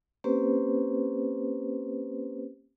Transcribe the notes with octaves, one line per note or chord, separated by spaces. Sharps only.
A#3 C4 C#4 G4 B4 C5